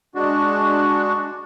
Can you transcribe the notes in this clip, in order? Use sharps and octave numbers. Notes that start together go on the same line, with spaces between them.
G#3 D4 F#4